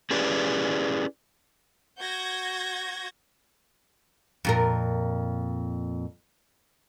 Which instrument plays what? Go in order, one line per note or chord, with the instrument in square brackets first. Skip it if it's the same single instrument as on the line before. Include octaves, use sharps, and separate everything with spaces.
[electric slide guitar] C#4 E4 G4 G#4 B4 D5
[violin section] F#4 G6 G#6 A#6
[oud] F2 A#2 A#4